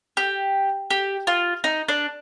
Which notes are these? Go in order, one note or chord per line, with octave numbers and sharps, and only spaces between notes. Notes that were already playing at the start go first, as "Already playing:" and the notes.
G4
G4
F4
D#4
D4